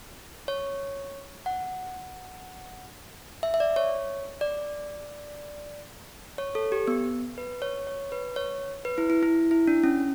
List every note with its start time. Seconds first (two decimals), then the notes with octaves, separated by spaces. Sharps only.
0.48 C#5
1.46 F#5
3.43 E5
3.54 E5
3.60 D5
3.76 C#5
4.41 D5
6.38 C#5
6.55 A4
6.72 G4
6.88 B3
7.38 B4
7.62 C#5
7.87 C#5
8.12 B4
8.36 C#5
8.85 B4
8.98 E4
9.10 E4
9.23 E4
9.51 E4
9.67 D4
9.83 C#4